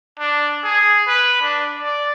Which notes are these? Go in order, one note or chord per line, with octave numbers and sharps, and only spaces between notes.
D4
G#4
B4
D4
D5